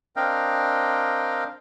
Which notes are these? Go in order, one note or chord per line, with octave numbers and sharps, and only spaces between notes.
C4 D4 A#4 D#5 F5 G5